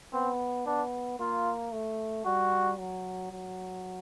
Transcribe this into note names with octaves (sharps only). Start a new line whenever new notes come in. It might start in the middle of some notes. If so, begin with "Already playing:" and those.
B3 C4
B3 D4
A#3 F4
A3
G3 F#4
F#3
F#3